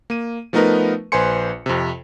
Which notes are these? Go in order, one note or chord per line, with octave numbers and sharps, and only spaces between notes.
A#3 D#7
F3 A3 B3 D#4 A#4 B4
A#1 B4 C5 G#5 C6 C#7
F2 C3